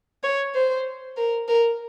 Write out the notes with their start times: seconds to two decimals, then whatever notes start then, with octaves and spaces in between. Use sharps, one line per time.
0.23 C#5
0.55 C5
1.17 A#4
1.48 A#4